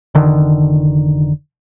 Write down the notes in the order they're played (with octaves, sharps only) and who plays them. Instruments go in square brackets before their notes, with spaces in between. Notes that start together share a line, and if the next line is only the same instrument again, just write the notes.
[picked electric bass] F1 D3 D#3